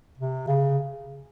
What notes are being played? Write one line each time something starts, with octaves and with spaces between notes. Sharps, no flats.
C3
C#3